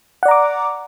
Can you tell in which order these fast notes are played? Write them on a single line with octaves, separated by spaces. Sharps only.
F#5 D5 A#5 D6